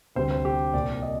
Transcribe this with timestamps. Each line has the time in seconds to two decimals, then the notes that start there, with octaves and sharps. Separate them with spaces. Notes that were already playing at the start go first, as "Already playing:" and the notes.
0.16 D2 C3 G3 C5
0.31 C5
0.45 G4
0.74 C2 A#2 G3 D5
1.02 D#5